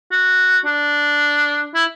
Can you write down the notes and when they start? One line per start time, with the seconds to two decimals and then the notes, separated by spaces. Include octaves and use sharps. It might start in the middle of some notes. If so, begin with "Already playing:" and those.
0.11 F#4
0.65 D4
1.75 E4